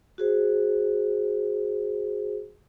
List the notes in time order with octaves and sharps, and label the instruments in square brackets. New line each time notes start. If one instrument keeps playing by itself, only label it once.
[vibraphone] F#4 G#4 C5